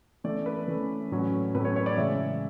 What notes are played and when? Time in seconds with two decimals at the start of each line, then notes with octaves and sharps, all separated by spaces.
0.24 E3 A3 C#4 D5
0.46 B4
0.68 E3 A3 C#4
1.11 A2 F#3 C#4
1.54 A2 F#3 C#4 B4
1.65 C#5
1.76 C#5
1.86 D5
1.97 C#3 E3 G#3 E5